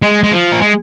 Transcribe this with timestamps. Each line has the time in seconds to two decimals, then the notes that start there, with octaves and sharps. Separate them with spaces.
0.02 G#3
0.23 G#3
0.32 F3
0.52 A#3
0.61 G#3